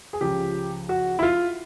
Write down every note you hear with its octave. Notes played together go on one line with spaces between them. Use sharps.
G#4
C#2 C#3 F3 G4
F#4
E4
F4